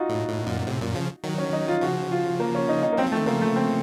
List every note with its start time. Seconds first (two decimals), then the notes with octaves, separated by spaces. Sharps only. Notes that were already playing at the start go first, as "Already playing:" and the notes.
Already playing: D#4 F4 F#4
0.09 A2
0.28 A2
0.47 F#2 A#2
0.66 A2 C3
0.81 F#2 A#2
0.95 C#3 F3
1.24 D#3 F#3
1.38 C#4
1.53 D#4
1.68 F4
1.81 C#3 F3 F#4
2.11 F4
2.40 A#3
2.55 C#4
2.69 D#4
2.83 D#4
2.92 A#3
2.98 F#3 C4
3.07 F3
3.12 A3
3.16 D#3
3.26 C#3 F3 A#3
3.41 A3
3.56 C4